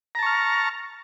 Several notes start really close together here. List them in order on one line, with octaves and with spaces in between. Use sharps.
A#5 A5 C#6 F6